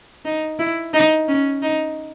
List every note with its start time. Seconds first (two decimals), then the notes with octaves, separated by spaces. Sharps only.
0.25 D#4
0.59 E4
0.93 D#4
1.28 C#4
1.62 D#4